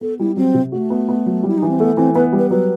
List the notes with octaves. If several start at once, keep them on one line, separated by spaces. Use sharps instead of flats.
B3 A4
G3 E4
F#3 C4
C3
A3 F#4
B3
B3
F#3
G3 E4
E3 D#4
C4
A3 B3
E3 C4
B3 B4
G3
B4
F#3 B4